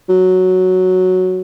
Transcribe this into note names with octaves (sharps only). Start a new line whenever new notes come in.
F#3